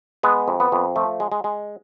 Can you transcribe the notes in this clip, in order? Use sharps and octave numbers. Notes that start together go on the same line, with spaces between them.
G#3 B3
F2
B3
F2
F3 A3
G#3
G#3
G#3